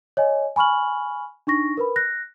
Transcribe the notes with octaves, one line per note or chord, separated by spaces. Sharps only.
C#5 D#5 G#5
G#5 B5 C#6 F6 F#7
D4 D#4 C#6 A#6
A#4 B4 B5
F#6 A#6